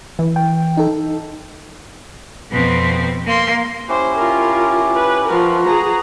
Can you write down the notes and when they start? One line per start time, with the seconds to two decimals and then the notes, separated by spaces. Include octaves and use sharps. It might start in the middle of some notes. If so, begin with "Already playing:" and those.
0.19 E3
0.36 G5
0.77 D#4 A4
2.50 F2 B2 C4
3.26 A#3 C6
3.89 C#4 E4 G4 C5
4.19 F4 A#4
4.94 B4
5.28 F3 F#4 A#4 B4
5.65 G#4 A#5